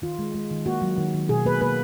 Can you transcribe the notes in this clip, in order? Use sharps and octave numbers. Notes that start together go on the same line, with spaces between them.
D#3 F4
G#3
G#3
D#3
A#3 F#4
F#3
D#3
D#3
B2 G#4
A#3 B4
A#3 B4